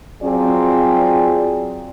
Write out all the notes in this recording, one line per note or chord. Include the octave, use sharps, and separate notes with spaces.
F#3 C4 F4 G#4 D5